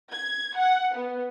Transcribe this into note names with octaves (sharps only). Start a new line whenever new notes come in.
G#6
F#5
B3